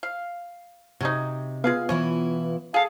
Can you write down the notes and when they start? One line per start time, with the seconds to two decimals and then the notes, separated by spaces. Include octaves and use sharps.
0.03 F5
1.01 C3 F#3 C#4 D#4
1.64 G#3 B3 F4 G#4 F5
1.89 B2 E3 C#4 E4
2.74 G#4 A4 F5